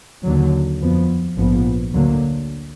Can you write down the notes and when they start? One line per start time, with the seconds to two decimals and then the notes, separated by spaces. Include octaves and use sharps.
0.23 D#2 D3 F#3
0.80 F2 F3 B3
1.37 A#1 G#2 F3 B3
1.93 D2 D3 F#3 A#3